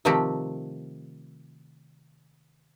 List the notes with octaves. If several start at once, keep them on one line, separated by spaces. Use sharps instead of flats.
C3 D#3 F3 A3 C4 G4